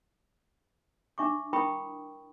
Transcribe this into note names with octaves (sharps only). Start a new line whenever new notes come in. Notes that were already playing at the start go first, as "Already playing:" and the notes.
D4 E5 C#6 D6
E4 A#4 G5 B5 C#6 D#6